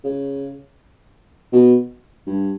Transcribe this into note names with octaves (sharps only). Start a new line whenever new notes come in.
C#3
B2
G2